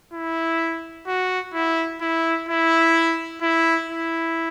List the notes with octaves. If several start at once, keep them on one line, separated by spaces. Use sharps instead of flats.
E4
F#4
E4
E4
E4
E4
E4